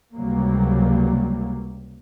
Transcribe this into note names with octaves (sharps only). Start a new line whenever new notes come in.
C#2 C3 F#3 G3 A#3